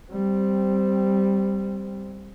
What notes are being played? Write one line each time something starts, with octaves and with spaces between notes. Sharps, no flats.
G3 C4